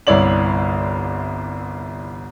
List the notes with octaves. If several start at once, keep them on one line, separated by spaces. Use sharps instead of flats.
G1 C2 E4 C#5 D5 F#7